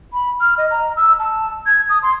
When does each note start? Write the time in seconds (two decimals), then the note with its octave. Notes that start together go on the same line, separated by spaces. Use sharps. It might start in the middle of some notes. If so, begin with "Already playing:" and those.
0.13 B5
0.41 F6
0.58 D#5
0.71 A#5
0.97 E6
1.19 A5
1.66 G#6
1.89 D#6
2.03 C6